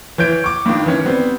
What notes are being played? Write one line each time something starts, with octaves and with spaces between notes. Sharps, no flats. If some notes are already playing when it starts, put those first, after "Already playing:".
E3 C#5 G6 D7
C#6 D6
G2 D#3
D#3 E3 C#4
G3 B3 C4